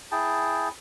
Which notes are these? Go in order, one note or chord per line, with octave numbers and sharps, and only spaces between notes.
E4 G#4 G5 A5